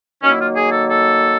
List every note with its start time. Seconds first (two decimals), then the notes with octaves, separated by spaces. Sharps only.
0.23 D#3 F#3 A#3 C#4
0.31 E4
0.40 F4
0.57 G#4
0.72 A4
0.89 A4